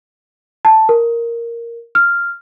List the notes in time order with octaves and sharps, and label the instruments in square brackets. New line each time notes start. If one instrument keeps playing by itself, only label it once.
[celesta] A5
A#4
F6